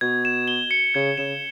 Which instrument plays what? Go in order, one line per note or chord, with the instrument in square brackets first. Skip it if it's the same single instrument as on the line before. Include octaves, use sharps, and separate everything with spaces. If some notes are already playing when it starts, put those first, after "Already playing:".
[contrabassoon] B2 [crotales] G#6
[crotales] E7
G7
C#7
[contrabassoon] C#3 [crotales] G#6
[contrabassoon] C#3 [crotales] E7